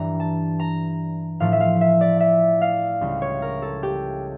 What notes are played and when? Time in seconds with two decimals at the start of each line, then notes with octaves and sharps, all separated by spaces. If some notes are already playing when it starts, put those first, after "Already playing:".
Already playing: G2 E3 G3 A#5
0.20 A5
0.59 A#5
1.40 A2 F3 A3 F5
1.52 E5
1.60 F5
1.81 E5
2.01 D5
2.20 E5
2.61 F5
3.01 C#2 C#3 G3
3.22 C#5
3.42 A#4
3.62 A4
3.83 G4